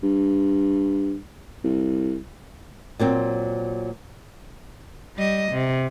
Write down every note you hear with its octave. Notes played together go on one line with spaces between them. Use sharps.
G2
C2
A#2 F#3 C4
G3 D#5
C3